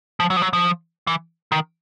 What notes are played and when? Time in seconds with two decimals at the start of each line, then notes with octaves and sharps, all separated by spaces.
0.20 F3
0.30 F#3
0.36 F3
0.42 F#3
0.53 F3
1.07 E3
1.52 D#3